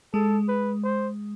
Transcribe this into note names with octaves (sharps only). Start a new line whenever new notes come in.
G#3 A4
B4
C5